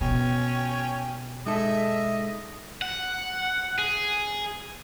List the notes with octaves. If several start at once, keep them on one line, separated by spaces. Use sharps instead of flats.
B2 C#4 G5
G#3 D#4 A4 D#5 E5
F#5
G#4